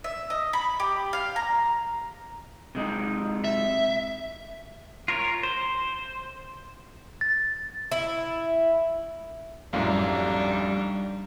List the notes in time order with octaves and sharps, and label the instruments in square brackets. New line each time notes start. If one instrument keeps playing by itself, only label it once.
[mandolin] E5
D#5
B5
G4
F5
A#5
[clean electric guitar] C3 G#3 D#4
[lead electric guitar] E5
[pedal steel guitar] F4 A#4 C#5
C5
[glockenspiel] A6
[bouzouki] E4
[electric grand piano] A#1 F#2 A2 [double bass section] G3 [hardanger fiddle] D4 D#4 [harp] F5